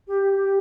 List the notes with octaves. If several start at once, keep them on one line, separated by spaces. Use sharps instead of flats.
G4
G4